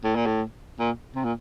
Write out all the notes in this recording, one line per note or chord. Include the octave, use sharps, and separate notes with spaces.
A2
A#2
A2
A#2
C3
A#2